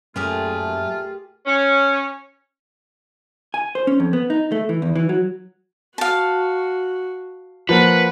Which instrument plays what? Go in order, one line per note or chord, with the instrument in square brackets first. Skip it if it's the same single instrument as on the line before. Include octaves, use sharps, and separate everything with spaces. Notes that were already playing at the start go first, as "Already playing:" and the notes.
[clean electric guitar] F#2 [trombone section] A#2 A3 [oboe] F4 [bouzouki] G4 G#4 A#4
[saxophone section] C#4
[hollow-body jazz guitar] G#5
C5
C#4
F2
B3
D#4
A3
E3
E2
E3
F#3
[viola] F#4 [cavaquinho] F5 A5
[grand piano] F3 A#3 [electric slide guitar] B4 [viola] F#5